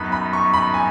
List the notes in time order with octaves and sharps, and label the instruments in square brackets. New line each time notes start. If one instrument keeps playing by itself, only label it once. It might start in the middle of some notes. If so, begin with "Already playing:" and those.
Already playing: [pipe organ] F#2 F#3 B3 D#4 [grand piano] B5
[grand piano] B5
C#6
B5
G#5